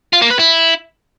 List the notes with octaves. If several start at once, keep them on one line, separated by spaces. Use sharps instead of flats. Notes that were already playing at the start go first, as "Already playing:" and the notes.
F4
A#3
B4
E4